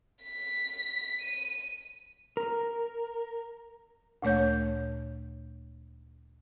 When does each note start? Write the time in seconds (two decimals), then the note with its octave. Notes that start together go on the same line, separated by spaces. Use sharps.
0.24 B6
1.21 D#7
2.37 A#4
4.22 D2 A#2 A3 C#5 G6